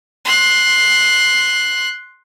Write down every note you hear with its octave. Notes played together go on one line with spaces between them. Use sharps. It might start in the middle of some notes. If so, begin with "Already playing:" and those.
C6 F#6